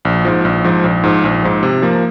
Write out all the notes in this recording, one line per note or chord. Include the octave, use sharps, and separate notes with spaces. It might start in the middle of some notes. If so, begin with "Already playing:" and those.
A#1
G#2 F3
A#1
G#2 F3
A#1
G#2 F3
A#1
G#2 F3
C3
F3 A#3